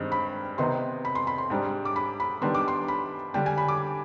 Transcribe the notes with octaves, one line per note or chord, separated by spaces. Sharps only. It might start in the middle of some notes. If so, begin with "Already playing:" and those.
Already playing: G2 D#3 G#3 C4
B5
C3 D#3 B3 D#4 C6
B5
C6
B5
C6
G#2 G3 D4
D6
B5
B5
D#3 G3 B3 D4 C6
D6
C6
B5
D3 G3 D4 G5
G#5
B5
D6